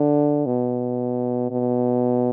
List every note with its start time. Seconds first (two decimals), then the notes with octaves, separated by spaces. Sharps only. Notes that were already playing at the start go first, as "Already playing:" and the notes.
Already playing: D3
0.46 B2
1.51 B2